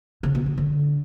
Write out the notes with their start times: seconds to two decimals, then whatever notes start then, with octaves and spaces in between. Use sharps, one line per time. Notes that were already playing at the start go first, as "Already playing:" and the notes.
0.23 C#3
0.35 B2
0.46 D3
0.58 D3